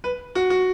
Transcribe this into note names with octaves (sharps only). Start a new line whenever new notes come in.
B4
F#4
F#4